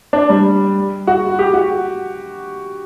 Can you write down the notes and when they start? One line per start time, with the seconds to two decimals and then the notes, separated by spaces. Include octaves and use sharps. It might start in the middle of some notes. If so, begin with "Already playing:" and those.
0.13 D4
0.30 G3
1.07 F#4
1.39 G4
1.54 F#4